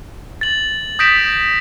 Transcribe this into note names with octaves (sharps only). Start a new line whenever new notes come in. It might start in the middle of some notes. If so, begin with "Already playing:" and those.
A6 F#7
D#6 G6 A#6 B6 D7 E7